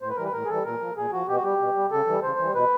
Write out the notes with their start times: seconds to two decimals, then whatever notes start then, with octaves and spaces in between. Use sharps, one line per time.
0.02 A2 C5
0.09 B4
0.16 E3 G3 A#4
0.24 B4
0.33 A2 A#4
0.45 G#4
0.49 E3 G3 A4
0.65 A#2 A#4
0.81 F3
0.97 A#2 G#4
1.13 F3 F#4
1.28 B2 G4
1.36 F#4
1.44 G3 G4
1.60 B2
1.76 G3
1.91 C#3 A4
2.07 E3 G3
2.23 C#3 C5
2.39 E3 G3
2.55 B2 B4